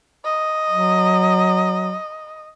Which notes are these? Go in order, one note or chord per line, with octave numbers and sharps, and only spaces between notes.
D#5
F#3